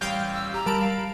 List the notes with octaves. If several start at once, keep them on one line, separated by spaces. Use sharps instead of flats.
A1 G3 F5 G5
E6
G4 A#5
G3 A#4 A5 B5 D7
F5